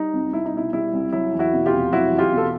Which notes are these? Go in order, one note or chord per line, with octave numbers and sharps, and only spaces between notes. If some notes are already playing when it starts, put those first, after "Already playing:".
Already playing: G3 D#4
C2
C2 E4
D#4
B2 E4
G3 E4
C2
F#3 E4
E2
E4 F#4
B2
F4 G4
F1
F#3 E4 F#4
E2
F4 G4
B2
A4